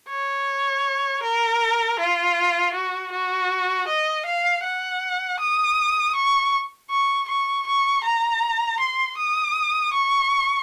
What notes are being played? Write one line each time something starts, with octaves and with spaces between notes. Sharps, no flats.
C#5
A#4
F4
F#4
F#4
D#5
F5
F#5
D#6
C#6
C#6
C#6
C#6
A#5
C6
D#6
C#6